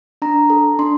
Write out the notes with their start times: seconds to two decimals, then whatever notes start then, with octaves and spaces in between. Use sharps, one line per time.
0.22 D4 A#5
0.50 A4
0.79 D4 C6